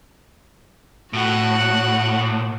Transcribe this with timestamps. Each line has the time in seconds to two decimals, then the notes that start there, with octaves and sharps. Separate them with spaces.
1.13 A2 F#4 F#5